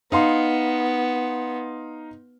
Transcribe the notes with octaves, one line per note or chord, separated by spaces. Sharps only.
B3 D#4 F5 C6